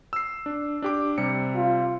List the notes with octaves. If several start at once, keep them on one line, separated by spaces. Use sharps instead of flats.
E6 C7
D4
D4 G4 D6
C3 G3 C#7
F4